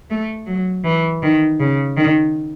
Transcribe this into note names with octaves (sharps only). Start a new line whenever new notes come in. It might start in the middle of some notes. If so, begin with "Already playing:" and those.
A3
F#3
E3
D#3
C#3
D#3